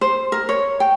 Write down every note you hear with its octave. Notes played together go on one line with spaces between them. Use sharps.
C5
A#4
C#5
G5